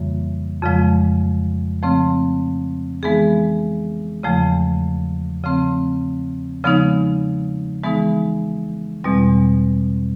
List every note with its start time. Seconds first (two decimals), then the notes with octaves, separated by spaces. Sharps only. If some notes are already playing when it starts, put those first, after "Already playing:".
Already playing: F2 C#3 E3 G3 A#3
0.62 F2 C#3 F3 G#3
1.83 C#3 F3 A3 C4
3.03 E3 G#3 B3 D#4 G#4
4.23 E2 C#3 F3 A3
5.44 C#3 F3 A3 C4
6.64 C#3 F3 G#3 B3 D#4
7.84 E3 G#3 B3 D#4 G#4
9.04 E2 B2 G3 C4